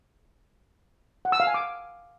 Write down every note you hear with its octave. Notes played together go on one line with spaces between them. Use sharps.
F#5
E6
F5
G#5
D6